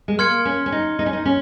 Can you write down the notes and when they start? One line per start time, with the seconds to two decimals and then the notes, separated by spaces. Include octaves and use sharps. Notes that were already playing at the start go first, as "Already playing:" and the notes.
0.08 G#3
0.19 A#3 C6 F6 G#6 C#7
0.45 C#4
0.66 C#4
0.72 D#4
0.99 D#4
1.06 C#4
1.13 D#4
1.25 C#4